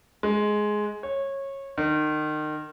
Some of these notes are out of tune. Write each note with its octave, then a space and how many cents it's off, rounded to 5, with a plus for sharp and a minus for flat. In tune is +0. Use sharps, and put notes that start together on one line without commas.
G#3 +10
C#5 -20
D#3 -30